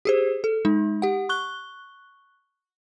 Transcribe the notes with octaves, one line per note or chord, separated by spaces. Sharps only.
G4 G#4 C5
A4
G#3 D#4
G4 F#5
C#6 F#6 G7